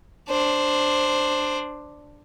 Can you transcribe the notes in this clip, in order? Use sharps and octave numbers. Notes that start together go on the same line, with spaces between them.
D4 C5